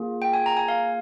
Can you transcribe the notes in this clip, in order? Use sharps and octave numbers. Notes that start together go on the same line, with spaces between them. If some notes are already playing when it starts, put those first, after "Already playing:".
Already playing: A#3 F4 G#4
G5
G#5
A#5
G#5
F5